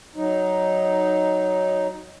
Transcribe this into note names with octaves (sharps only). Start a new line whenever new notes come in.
F#3 D#4